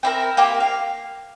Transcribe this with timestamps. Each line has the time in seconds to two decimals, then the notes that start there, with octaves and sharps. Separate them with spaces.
0.03 C4 E4 A#4
0.37 A#3 C4 G4
0.60 F5